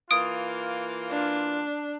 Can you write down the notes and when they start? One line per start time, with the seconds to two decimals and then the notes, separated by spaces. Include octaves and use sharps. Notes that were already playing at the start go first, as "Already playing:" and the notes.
0.11 E3 A#3 F4 D#6 D7
1.10 D4